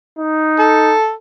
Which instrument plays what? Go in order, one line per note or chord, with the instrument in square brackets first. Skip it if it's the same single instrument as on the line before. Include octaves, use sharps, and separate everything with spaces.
[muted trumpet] D#4
[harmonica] A4